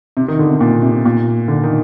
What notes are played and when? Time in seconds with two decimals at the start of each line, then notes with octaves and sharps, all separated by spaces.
0.17 C3
0.28 D#3
0.39 D3
0.50 C3
0.60 A#2
0.82 C3
1.05 A#2
1.48 D3
1.64 D#3